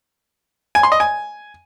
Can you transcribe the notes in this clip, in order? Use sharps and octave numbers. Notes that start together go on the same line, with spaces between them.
G#5
C6
D#5
G#5